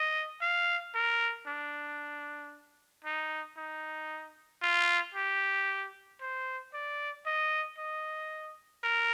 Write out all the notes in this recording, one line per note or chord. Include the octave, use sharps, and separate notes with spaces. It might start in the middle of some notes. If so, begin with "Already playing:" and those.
Already playing: D#5
F5
A#4
D4
D#4
D#4
F4
G4
C5
D5
D#5
D#5
A#4